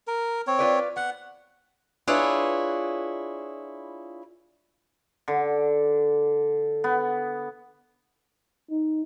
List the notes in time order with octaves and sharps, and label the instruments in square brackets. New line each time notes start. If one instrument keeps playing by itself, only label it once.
[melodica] A#4
C4 C#5
[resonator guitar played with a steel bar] F4 B4 D5
[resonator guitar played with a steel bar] B3 [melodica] F#5
[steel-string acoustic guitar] D4 E4 F4 G#4 B4 C#5
[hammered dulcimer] D3
B3
[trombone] D#4